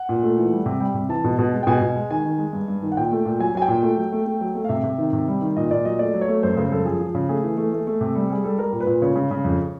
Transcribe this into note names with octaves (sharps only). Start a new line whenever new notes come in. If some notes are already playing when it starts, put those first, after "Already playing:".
Already playing: F#5
A#2
A3
E3
G3
C3
G3 G5
C3
E3 A5
B2
B2
G#3
G5
B2 G#5
B2
G#3
D#3 G#5
D#3
G#3
G2
G2
D#3
F#5
A#2 G5
A3
A#2
F#3 G#5
F#3 G#5
G5
A#2
A3
F#3
A3
A3
F#3
A3
F5
C3 E5
C3
D#3
C3
G3
D#3
A#2 D#5
A#2 D5
F#3 D#5
A3 D5
F#3
C#5
A3
F#2 C5
C#3 C5
F#2 A4
F3 G#4
F3
C#3
A3 G#4
E3
A3
A3
A3
C3
G3
G3 G#4
G3 A4
G3 A#4
A#2
B4
A#2
C#3 C#5
C#3
C#3
F2